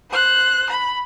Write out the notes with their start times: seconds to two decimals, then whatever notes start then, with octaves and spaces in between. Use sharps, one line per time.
0.10 C5 F#6
0.70 B5